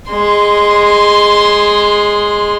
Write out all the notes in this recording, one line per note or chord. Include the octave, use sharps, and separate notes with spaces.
G#3 C6